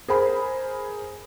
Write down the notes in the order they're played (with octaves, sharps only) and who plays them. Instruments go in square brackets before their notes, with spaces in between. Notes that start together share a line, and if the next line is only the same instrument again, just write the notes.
[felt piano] G#4 A#4 C5 G#5 B5